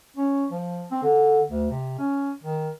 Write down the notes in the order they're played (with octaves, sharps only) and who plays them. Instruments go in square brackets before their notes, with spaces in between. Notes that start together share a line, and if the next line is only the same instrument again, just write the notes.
[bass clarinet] C#4
F3
C4
D3
D2
C3
C#4
D#3